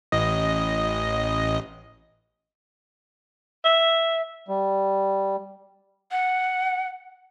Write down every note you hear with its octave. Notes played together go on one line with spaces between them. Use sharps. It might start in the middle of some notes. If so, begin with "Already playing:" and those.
A1 D#5
E5
G3
F#5